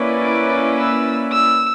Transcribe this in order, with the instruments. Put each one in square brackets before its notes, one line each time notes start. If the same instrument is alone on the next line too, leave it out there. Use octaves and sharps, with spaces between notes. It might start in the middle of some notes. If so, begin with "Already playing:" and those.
Already playing: [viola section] A#3 C#4 E4 B4 D5
[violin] D6
E6
E6